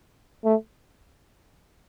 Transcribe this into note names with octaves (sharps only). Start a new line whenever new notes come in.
A3